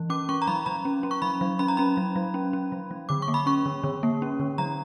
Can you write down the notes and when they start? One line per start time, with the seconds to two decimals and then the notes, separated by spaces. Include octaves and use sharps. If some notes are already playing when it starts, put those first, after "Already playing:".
Already playing: E3
0.10 C#4 D6
0.29 C#4 C#6
0.42 A#5
0.47 F#3 B5
0.66 F#3 A#5
0.85 C#4
1.03 C#4
1.11 C#6
1.22 F#3 B5
1.41 F#3
1.59 C#4 B5
1.68 A#5
1.77 C#4 B5
1.97 F#3
2.16 F#3
2.34 C#4
2.53 C#4
2.72 F#3
2.91 F#3
3.09 D3 D6
3.22 C#6
3.28 A#3
3.34 B5
3.46 C#4 C#6
3.66 D3
3.84 D3
4.03 A#3
4.22 C#4
4.40 D3
4.58 F#3 A#5